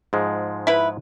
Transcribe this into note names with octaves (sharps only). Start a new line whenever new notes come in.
G#2 F3 G#3
E4 B4